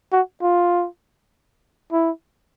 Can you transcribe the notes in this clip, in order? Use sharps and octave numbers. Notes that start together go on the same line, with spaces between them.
F#4
F4
E4